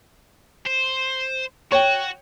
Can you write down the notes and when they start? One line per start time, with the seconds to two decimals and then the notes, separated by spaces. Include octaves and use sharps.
0.66 C5
1.72 F#4 C#5 G5